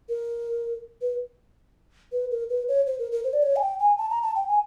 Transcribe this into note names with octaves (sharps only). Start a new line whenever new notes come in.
A#4
B4
B4
A#4
B4
C#5
C5
A#4
A#4
C5
D5
C#5
G#5
G5
G#5
A5
A#5
A5
G5
G#5